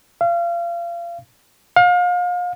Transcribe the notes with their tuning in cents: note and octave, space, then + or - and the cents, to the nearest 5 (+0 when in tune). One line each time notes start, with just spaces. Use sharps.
F5 -30
F5 +35